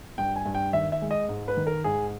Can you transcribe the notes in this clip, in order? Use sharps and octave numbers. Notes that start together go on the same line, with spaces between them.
G2 G5
G#5
G2
G5
D#3 E5
E5
G#3
D#5
G#2
B4
D#3
A#4
G#2 G#4